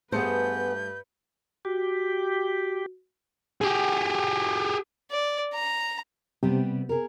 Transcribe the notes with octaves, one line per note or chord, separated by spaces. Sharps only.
G2 A3 B3 G#4 B4 C5 G6 C#7
F#4 G4
G4 G#4
D5
A#5
C3 G3 B3 C4
G#4 A#4